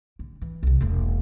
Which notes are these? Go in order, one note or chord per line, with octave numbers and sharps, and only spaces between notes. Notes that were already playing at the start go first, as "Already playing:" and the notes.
D3
E3
C2 C3
E1 A#3